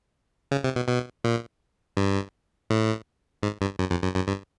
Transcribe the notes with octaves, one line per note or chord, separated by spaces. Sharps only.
C#3
C3
B2
B2
A#2
G2
A2
G#2
G2
F#2
F2
F#2
F#2
G2